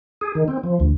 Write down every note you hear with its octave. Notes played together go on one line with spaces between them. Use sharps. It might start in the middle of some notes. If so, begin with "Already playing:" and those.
G#4
D#3
C4
F3
D2